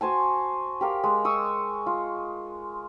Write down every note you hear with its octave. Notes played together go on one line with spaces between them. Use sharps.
F#4 C5 G#5 A5
G4 A#4 F5
G#3
C#6 D#6 E6
F4